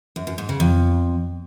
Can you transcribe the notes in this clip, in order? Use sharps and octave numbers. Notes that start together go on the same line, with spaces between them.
F#2
F#2
G#2
C#3
F2